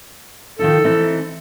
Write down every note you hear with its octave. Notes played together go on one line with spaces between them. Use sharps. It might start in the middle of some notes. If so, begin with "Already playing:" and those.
D#3 F3 D#4 A4
E3 C4 D#4